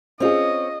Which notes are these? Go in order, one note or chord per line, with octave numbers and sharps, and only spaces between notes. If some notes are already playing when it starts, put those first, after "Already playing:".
C4 C#4 F4 G#4 C#5 D#5